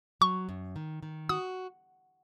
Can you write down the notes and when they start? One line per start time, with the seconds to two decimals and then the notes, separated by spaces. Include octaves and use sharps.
0.21 F#3 C#6
0.49 F#2
0.76 D#3
1.03 D#3
1.29 F#4 D#6